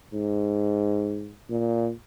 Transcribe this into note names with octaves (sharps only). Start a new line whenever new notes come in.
G#2
A#2